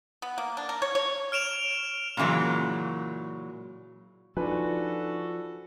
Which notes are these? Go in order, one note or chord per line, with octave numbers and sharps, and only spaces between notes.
B3
A#3
D4
A#4
C#5
C#5
F6 D7 E7 F7
A#2 C#3 E3 F#3 G#3
F3 D4 D#4 F4 F#4 A4 B4 G#5